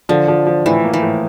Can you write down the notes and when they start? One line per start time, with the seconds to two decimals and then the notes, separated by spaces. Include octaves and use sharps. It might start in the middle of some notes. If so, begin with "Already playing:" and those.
0.09 D3 F3
0.28 F3
0.46 F3
0.66 A2 E3
0.84 A#3
0.93 E3
1.03 A2